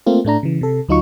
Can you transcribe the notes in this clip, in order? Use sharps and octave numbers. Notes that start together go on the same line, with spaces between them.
A3 A#3 C4 F4
A2 A3 D4 A#5
C#3 E3
C3 A4
D2 F#3 D#4 F4 C#6